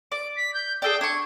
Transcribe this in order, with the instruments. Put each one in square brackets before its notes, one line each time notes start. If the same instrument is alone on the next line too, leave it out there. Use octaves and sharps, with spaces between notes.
[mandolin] D5 [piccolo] D7
[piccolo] B6
G6
[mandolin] G#4 A4 D5 [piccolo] G5
[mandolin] D4 C#6 [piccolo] G#6